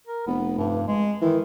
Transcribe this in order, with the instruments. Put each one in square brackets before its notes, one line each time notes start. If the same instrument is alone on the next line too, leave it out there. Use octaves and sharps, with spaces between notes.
[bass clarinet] A#4
[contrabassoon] F1 [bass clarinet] B3
[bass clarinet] G2
G#3
[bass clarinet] D#3 [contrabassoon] E3